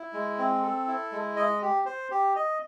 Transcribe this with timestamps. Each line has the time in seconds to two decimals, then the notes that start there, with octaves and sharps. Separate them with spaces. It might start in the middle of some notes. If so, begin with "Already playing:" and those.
Already playing: E4
0.13 G#3
0.38 C4
0.62 A4
0.87 E4
1.12 G#3
1.36 D#5
1.62 G4
1.86 C5
2.11 G4
2.36 D#5